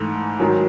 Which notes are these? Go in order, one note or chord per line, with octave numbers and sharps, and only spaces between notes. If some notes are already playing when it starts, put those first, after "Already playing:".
Already playing: G#2 E3 A3
G#2 D#3 F#3